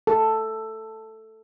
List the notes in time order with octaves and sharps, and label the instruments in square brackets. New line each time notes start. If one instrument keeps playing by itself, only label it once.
[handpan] A4